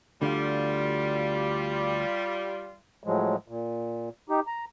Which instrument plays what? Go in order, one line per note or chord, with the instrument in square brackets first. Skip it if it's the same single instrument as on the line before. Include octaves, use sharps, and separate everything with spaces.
[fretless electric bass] D2 D3 [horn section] G3 F4
[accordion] A2 F3 F#3 G#3
A#2
D#4 G4
A#5